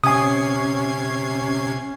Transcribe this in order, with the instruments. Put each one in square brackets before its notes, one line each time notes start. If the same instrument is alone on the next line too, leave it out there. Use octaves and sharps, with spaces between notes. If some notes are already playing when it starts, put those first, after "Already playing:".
[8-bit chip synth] C3 G#6 C7 [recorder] C#4 [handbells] G#5 D#6